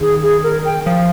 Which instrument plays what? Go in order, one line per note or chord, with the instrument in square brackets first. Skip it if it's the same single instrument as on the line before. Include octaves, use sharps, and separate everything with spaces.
[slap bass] D#3 [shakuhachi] G#4
[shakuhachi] G#4
A#4
G5
[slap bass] F3 [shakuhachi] F5